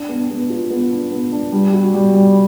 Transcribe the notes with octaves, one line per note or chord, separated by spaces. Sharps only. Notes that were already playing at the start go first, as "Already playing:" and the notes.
Already playing: D4
B3
B3
F4
B3
D4
B3
D4
G3
F#4
G3
G3